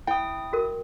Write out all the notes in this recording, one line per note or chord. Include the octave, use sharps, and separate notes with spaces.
E4 G5 D#6
F#4 A#4